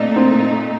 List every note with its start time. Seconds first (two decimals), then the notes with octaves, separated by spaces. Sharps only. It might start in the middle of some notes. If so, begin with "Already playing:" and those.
Already playing: A#2 A3 C4 D4 D#4
0.16 C4